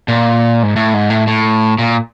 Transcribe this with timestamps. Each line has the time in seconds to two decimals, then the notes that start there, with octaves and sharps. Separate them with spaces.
0.08 A#2
0.63 G#2
0.76 A2
0.94 G#2
1.10 A2
1.27 A2
1.78 A#2